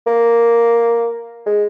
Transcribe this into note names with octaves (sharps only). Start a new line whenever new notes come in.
A#3
G#3